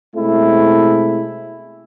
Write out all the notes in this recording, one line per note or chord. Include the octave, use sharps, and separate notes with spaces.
B2 G#3 A3 C4 E4